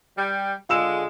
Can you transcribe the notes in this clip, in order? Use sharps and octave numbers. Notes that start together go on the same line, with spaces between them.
G3
D3 G#3 F4 E6 E7